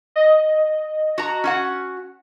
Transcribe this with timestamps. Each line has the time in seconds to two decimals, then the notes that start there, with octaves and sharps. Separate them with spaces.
0.16 D#5
1.18 F#4 A#5
1.44 C#4 F#4 F#5